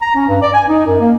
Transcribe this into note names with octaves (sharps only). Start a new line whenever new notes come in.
A#5
C#4
G2
D5
G#5
D#4
F#2
A#3